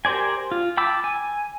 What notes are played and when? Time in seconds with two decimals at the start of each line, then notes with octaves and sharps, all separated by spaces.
0.05 G4 A#4 C5 D5 G#5
0.52 F4
0.77 G5 A5 B5 D6 E6
1.04 G#5